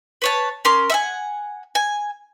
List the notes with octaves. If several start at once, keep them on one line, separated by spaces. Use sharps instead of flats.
B4 C#5 A5
C#4 A#4 C6 D6
E5 F#5 G#5
G#5